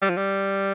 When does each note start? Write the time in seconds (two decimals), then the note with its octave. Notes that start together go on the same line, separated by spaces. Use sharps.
0.02 G3
0.09 F3
0.17 G3